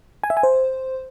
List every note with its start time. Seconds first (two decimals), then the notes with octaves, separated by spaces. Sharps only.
0.24 G#5
0.30 E5
0.37 G#5
0.43 C5